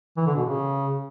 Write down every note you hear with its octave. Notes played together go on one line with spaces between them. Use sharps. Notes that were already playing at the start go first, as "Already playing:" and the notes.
E3
D3
B2
C#3